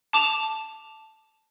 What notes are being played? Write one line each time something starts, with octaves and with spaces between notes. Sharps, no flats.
A5 D6 E7 F7